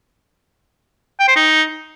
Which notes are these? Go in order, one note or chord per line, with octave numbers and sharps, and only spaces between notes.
G5
C5
D#4